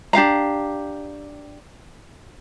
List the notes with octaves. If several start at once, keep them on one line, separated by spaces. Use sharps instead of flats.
D4 G4 F5 A#5